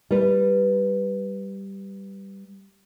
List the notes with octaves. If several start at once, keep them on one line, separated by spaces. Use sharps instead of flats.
G3 B4